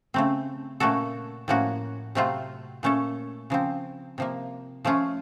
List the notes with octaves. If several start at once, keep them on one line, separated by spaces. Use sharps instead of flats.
C#3 A3 C4
A#2 A3 C#4 F#4 A4
A2 F3 A#3 C#4 F#4
C3 F#3 A3 C4 F4
A#2 A3 C#4 A4
C#3 F3 C4
C3 F3 A#3
F3 A3 C#4 F4